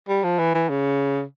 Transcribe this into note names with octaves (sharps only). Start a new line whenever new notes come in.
G3
F3
E3
E3
C#3